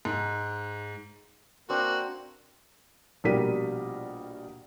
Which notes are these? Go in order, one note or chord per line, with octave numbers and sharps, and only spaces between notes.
G#2
A#3 C4 D4 F#4
A#1 B2 G3 A#4 B6 D#7